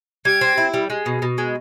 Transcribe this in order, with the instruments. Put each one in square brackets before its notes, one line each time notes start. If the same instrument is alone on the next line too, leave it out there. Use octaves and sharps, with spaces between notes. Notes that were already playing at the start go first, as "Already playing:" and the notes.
[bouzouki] G3 [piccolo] G#6
[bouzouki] C4
E4
G3
G#3
B2
B2
G#3